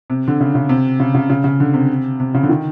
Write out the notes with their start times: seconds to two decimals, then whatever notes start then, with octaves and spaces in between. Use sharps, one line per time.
0.10 C3
0.28 D3
0.40 C#3
0.55 C#3
0.69 C3
1.00 C#3
1.14 C#3
1.30 C#3
1.44 C#3
1.60 D3
1.74 C3
2.20 C3
2.34 C#3
2.43 D3
2.49 D#3